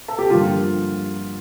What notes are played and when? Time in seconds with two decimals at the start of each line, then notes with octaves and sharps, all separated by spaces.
0.08 A4
0.19 G4
0.30 G2 D3 F3 A#3 F4